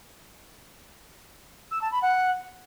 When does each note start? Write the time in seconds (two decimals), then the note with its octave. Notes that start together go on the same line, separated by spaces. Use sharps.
1.71 E6
1.81 A5
1.91 B5
2.01 F#5